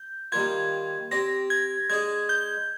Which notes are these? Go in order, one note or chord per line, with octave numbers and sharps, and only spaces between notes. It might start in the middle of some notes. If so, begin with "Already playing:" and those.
Already playing: G6
D#3 G3 A#3 F4 G#6
C4 G4 D5 A#6
G#6
G#3 D4 G#4 D#5 G#6
G6